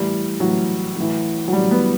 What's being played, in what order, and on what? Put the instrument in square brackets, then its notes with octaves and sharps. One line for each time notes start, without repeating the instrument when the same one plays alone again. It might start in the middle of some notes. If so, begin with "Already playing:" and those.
Already playing: [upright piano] A2 E3 G3
A2 E3 F#3
A2 E3
F#3
A2 E3 G3
B3